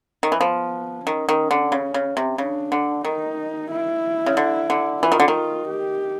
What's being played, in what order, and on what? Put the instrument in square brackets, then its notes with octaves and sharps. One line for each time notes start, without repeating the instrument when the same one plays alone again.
[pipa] D#3
E3
[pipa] F3 [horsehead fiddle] B3
[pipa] D#3 [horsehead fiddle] C#4
[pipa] D#3
D3
C#3
C#3
C3
[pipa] C#3 [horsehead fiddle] D4
[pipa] D3
[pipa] D#3 [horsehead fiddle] D#4
[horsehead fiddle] E4
[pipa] C#3
D3
D3
[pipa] E3 [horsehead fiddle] F4
[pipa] D#3
D3
D#3
[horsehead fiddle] G4